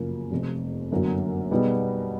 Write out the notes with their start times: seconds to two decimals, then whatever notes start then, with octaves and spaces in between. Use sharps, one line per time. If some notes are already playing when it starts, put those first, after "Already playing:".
Already playing: G1 F#2 C#3 F3 A#3
0.31 F1 F2 C3
0.91 G1 F#2 D3 F#3 A#3
1.51 B2 G3 B3 D#4 G#4